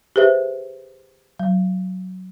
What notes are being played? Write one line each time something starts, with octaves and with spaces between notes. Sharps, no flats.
G4 G#4 B4 C5 E5
F#3